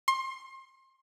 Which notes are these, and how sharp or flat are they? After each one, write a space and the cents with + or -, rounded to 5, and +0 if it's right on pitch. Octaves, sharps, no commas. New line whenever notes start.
C6 +30